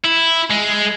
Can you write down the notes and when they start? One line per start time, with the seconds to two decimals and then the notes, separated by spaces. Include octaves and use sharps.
0.05 E4
0.50 G#3